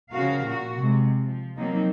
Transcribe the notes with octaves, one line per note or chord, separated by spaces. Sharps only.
C#3 F3 F#4 A#4 F5
A#2 F#4
C3 G#3
F3
F3 F#3 A#3 C4 D#4